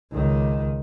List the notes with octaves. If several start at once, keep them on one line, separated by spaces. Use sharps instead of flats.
C#2 D#3